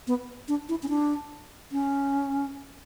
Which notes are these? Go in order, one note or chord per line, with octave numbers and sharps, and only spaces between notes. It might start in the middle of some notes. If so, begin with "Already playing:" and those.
B3
D4
E4
C#4
D4
C#4